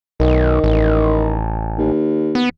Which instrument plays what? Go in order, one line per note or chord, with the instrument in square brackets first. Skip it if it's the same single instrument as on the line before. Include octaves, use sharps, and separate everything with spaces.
[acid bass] B1 [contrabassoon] D#3
[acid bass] A1
[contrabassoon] D#2
[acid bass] B3